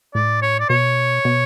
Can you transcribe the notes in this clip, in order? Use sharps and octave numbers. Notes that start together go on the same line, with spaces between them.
A2 D5
C#5
D5
B2 C#5
B2